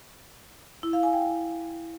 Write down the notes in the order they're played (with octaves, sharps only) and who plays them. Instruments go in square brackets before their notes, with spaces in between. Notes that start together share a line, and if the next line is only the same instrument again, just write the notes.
[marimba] E4
F5
G#5
G5